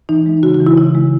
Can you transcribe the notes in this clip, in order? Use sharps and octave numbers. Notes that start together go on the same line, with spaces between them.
E3 D#4
G#3
C#3 F#4
F#4
E3
E4
C#3 E4
G#3